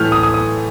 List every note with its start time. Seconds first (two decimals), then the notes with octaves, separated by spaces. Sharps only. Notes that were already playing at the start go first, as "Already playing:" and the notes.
Already playing: A2 E3 A3 F6 G6
0.12 D#6
0.23 D#6
0.34 D#6